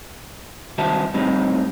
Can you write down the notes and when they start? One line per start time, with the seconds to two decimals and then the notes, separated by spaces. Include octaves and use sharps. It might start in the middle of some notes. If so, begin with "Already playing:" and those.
0.78 C2 D#3 F#4 C5 E5 A5
1.14 A2 G3 C4 D#4